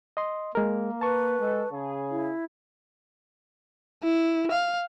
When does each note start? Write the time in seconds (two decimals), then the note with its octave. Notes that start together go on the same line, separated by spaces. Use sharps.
0.17 D#5 C6
0.55 G#3 A#3 A#4
1.01 B4 A5 C#6
1.40 G#3 A4
1.72 C#3 G#4
2.11 E4
4.03 E4
4.52 F5